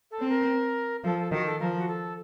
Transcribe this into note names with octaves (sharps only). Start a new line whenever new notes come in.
A4
C4
A#4
F3 A4
A4
D#3 F#4
A4
F3 A#4
F#4
A4